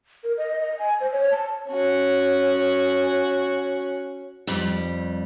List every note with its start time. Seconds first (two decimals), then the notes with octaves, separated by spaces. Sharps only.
0.24 A#4
0.37 D#5
0.59 D#5
0.79 G#5
1.00 C5
1.12 C#5
1.31 A5
1.68 C#4 F#4
4.47 F2 G3